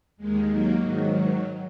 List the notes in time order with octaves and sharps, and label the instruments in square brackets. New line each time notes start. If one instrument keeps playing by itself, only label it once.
[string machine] D#2 D#3 G#3
F#3 A#3
G#2 D#3 F#3